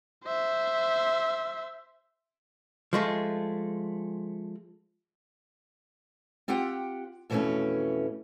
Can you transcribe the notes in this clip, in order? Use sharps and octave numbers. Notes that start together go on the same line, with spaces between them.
C5 E5
F3 G#3 A3
C4 F4 G4 F#5 G5
F2 B2 E3 G#3 A3 C#4